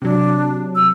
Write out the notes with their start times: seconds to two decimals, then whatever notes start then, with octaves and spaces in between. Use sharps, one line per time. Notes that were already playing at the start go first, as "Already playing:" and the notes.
0.02 C3 F#3 D4
0.76 E6